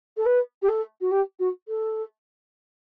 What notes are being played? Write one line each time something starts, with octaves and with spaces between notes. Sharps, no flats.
A4
B4
G4
A4
F#4
G4
F#4
A4